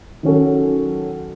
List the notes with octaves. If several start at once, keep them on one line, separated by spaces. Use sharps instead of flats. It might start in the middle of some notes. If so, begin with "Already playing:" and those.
D#3 F#3 C#4 F#4 A4